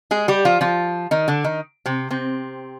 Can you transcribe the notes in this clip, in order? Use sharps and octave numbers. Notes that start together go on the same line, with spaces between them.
G#3 G#4
G3 G4
F3 F4
F3 F4
D#3 D#4
D3 D4
D#3 D#4
C3 C4
C3 C4